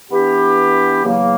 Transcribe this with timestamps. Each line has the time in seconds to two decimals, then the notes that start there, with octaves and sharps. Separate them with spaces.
0.11 E3 B3 D4 G4
1.03 E2 C#3 F#3 A#3